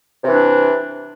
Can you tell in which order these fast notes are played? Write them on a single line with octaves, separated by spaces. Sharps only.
C3 E3 D4